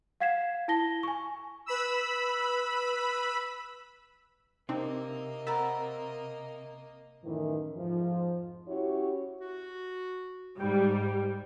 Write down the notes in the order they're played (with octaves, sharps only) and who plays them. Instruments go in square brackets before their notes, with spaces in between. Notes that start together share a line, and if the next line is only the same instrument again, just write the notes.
[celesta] F5 F#5 G#6 B6 C7 E7
E4 A5 A#6 G7
G#5 C#6
[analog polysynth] B4 B5 E6
[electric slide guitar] C3 [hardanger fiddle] A#3 D#5 [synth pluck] C4 D4 D#4
[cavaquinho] A#4 C5 F#5 [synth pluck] B5 E6 A6
[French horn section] F#2 A2 D#3 E3
F2 G#2 F3
C#4 E4 F#4 G4 C#5
[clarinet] F#4
[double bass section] G#2 [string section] G3 [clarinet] G5